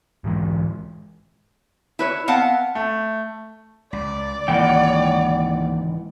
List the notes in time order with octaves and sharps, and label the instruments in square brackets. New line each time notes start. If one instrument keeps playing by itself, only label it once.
[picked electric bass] G#2 E3 G3 G#3
[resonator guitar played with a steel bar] E4 B4 C#5
B3 C4 F5 F#5 A5
[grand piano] A3
[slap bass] C#2 [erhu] D5
[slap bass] C#2 D#3 A#3 [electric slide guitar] G#2 E3 [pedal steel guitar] F#5 G5